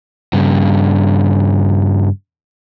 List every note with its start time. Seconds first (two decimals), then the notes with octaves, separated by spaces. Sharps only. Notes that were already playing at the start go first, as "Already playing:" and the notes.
0.33 G2 C#3